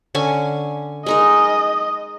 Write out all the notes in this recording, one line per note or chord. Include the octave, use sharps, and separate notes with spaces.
D3 C#4 G#5
G#3 D#4 A#4 D#5